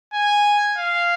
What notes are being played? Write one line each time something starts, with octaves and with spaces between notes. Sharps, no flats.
G#5
F5